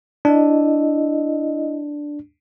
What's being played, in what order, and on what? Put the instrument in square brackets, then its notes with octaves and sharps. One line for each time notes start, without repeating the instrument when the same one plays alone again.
[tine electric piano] D4 [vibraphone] E4 D#5